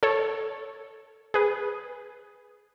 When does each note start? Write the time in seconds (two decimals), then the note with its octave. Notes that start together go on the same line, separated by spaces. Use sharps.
0.03 A4 C#5
1.34 G#4 B4